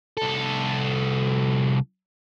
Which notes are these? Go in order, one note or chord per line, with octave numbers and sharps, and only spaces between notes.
C2 A4